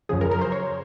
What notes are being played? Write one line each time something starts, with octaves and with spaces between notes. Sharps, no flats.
F#2 C#3 F3 G#4
A#4
A#4
C5
C#5